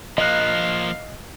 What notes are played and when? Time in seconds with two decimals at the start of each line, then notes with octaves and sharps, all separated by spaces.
0.18 F3 A#3 D#5 F5 F#6